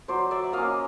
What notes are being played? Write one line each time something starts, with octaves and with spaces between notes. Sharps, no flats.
F#3 C5 D5
D5 E5
A#3 C#4 D#5 F5